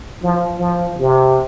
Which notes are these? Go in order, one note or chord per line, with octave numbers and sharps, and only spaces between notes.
F3
F3
C3